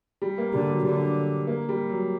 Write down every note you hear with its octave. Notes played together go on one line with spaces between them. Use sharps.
G3
A#3
D3 G3
F#3
D3 G3
A#3
G3
F#3